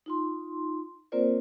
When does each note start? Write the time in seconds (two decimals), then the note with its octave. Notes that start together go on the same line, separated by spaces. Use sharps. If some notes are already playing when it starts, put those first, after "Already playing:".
0.06 D#4 F4 C6
1.12 A#3 C4 F4 A#4 C5 D5